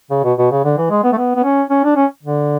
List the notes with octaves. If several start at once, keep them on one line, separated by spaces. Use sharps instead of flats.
C#3
B2
B2
C#3
D3
E3
G#3
B3
A3
B3
B3
C#4
C#4
D4
C#4
D3